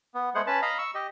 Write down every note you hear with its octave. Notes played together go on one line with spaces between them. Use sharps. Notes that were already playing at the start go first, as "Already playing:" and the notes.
B3
G#3 A3 B3 G#4 C5 F#5
C#4 B4 A5
D#5 F5 A#5 B5
C#6 E6
G4 D#5